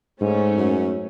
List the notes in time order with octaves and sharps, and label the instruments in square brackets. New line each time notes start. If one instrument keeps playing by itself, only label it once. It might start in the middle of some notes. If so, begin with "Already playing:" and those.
[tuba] G#2 [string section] A3 C#4
[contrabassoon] F#2